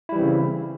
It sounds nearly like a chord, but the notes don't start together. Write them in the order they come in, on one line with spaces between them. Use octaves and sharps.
E4 G3 E3 C4 C#3